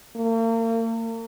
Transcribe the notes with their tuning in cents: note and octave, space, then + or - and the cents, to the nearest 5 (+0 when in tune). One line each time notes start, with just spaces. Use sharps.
A#3 -40